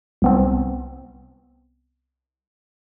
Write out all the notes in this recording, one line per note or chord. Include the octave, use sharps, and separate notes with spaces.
C2 B3 C4